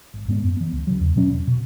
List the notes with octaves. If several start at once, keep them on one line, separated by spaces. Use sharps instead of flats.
G#1
G#2 G#3 B3
F#2
E3 B3
C#2
C#3 F#3
E2
B2 F#3 C#4
E1
B2